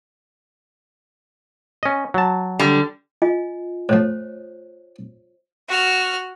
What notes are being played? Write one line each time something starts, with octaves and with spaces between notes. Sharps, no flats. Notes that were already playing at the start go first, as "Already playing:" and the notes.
C#4 D#5
F#3 A5
D3 G3
F4 D#5 G#5
A2 F3 C5 C#5
F#4 F6